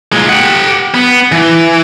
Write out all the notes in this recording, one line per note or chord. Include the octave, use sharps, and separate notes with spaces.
A#2 G#3
G4 F#5
B3
E3